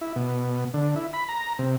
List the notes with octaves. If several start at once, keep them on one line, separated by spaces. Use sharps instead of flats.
E4
B2
D3
E4
B5
A#5
C3